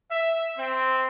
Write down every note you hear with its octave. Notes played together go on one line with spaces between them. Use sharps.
E5
C4